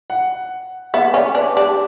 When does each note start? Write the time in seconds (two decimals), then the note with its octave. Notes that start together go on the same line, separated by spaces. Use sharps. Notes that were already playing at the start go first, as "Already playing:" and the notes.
0.10 F#5
0.94 B3 E5
1.14 C#4 D5
1.35 D4 B4
1.56 D4 G4